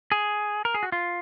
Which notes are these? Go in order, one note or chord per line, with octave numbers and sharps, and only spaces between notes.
G#4
A#4
G#4
F#4
F4